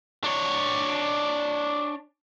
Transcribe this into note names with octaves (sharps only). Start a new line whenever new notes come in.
D4 C#5